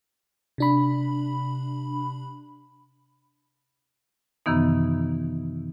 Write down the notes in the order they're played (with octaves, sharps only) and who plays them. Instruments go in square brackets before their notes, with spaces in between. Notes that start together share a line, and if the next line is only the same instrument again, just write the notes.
[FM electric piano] C3 D4 B5
[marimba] F#2 C3 D#3 E3 B3 D#4